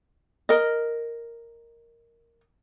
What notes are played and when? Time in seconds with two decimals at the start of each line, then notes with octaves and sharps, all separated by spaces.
0.49 A#4 D#5